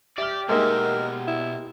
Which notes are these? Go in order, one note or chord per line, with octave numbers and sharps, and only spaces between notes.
G4 D5 E5 F6
B2 G#3 A#3 D#4 A#4 E5
E4